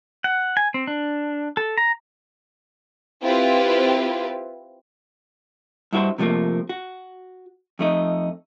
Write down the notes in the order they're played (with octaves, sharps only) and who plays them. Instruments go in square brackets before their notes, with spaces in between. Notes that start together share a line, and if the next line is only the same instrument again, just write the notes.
[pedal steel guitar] F#5
G#5
C4
D4
A4
A#5
[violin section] C4 E4 F4 G4 B4
[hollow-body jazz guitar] G2 E4 F#4 A#4 C5
C3 F3 F#3 A3 A#3
F#4
F2 A3 D#4